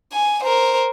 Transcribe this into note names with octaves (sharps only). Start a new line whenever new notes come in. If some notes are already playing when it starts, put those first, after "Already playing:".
G#5
A#4 C5